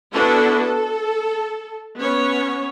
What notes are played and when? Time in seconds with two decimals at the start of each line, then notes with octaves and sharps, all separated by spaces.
0.13 B3 D4 E4 F#4 A4 B4
0.61 A4
1.99 B3 C#4 C#5